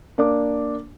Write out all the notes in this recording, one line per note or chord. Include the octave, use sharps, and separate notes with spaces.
A#3 D4 D6